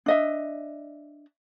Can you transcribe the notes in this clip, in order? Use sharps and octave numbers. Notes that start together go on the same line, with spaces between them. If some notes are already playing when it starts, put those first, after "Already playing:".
D4 D#5 E5